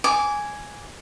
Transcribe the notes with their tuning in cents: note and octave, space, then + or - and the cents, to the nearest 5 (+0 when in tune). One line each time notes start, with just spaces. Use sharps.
G#5 +0 D6 -20